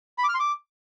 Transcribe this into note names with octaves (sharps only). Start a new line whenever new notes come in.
B5
D6
F6
C6
D6